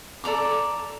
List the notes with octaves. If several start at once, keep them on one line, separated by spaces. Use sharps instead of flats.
A4 D5 A#5 D6